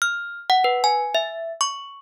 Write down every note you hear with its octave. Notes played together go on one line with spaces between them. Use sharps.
F6
F#5
B4
G#5
E5
C#6